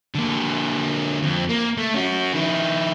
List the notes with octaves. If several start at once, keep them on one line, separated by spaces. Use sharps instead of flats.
D3 A#3
F2
A#3
A3
C#4 F#4
D#3 E4